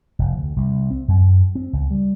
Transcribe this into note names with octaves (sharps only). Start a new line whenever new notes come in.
F1
D2
C2
C4
F#2
C4
C#2
G3